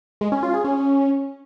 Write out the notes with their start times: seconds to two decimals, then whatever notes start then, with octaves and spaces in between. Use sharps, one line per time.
0.21 G#3
0.32 C#4
0.43 F4
0.54 G#4
0.64 C#4